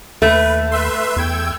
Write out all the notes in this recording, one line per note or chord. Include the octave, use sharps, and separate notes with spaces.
D#2 A3 B4
B4 E5 C6
E2 G5 E6 G#6